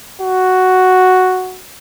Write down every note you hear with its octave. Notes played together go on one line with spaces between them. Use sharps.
F#4